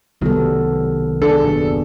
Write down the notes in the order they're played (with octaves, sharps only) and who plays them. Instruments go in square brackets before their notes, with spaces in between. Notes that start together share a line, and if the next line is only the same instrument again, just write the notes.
[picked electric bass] C2 D#3 F#3 [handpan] G3 B3 A4
[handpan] D4 G#4 [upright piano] A4
[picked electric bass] F#1 D#2 B2